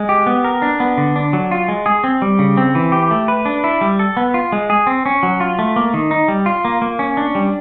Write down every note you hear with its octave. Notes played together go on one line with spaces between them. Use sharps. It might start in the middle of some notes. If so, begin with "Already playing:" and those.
Already playing: G#3
G4
B3
A#4
D4
B3
D3
D4
F#3
F4
G#3
G#4
C4
G3
C#3
C4
E3
G4
A3
B4
D4
E4
G3
A4
B3
F4
G#3
G#4
C4
C#4
F#3
F4
A3
A#3
D#3
D#4
G3
F4
A#3
A#3
C#4
D4
G3